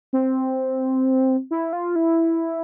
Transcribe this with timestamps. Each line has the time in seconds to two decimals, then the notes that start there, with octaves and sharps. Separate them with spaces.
0.13 C4
1.51 E4
1.73 F4
1.96 E4